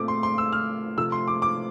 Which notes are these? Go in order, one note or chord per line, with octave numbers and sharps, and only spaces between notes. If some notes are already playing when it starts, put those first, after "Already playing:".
Already playing: A#2 A3 C4 D6
C6
C6
E6
F6
C3 F3 A3 E6
C6
D6
D6